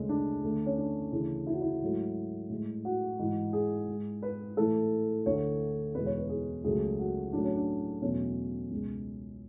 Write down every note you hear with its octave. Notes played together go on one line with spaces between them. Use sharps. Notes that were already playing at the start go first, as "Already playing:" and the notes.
Already playing: D2 C#3 G#3
D4
D2 D3 A3
C#4
D4
D2 C#3 E3
E4
F#4
E4
G#2 F#3 A3
A2 G#3
F#4
G#2 E3 G#3
G#4
G#2 G#3
B4
A2 E3 A3 A4
D2 D3 A3 C#5
E2 B2 G#3 B4
C#5
B4
G#4
C#2 C#3 F#3 A3 G#4
F#4
A2 F#3 A3 D4
C#4
D4
E2 B2 F#3 A3 C#4
C#2 B2 G#3